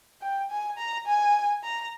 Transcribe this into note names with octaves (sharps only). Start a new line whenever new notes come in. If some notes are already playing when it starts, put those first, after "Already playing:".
G5
G#5
A#5
G#5
A#5